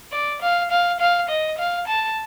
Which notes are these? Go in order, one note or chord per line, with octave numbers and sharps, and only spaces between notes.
D5
F5
F5
F5
D#5
F5
A5